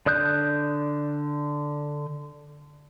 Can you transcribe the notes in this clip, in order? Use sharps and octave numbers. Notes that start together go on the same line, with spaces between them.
D3 D5 D#6 F#6 G6